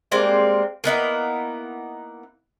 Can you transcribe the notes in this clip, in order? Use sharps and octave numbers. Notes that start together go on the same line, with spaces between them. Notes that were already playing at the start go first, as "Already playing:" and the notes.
G3 G#3 A#3 C4
A#3 B3 D#4 E4